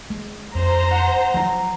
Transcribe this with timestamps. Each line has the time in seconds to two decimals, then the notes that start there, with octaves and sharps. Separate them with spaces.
0.10 G#3
0.55 F2 C5 A#5
0.91 F#5
1.34 F3 F#3 A#5 C6